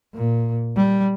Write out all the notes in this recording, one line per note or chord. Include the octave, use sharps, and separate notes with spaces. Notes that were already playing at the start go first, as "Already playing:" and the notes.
A#2
G3